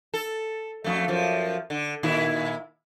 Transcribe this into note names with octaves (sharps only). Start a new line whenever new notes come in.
A4
F2 A3
F#2 F3
D3
A#2 D#3 E4